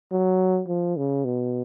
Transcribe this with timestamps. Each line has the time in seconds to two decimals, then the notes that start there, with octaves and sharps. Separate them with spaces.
0.12 F#3
0.68 F3
0.97 C#3
1.25 B2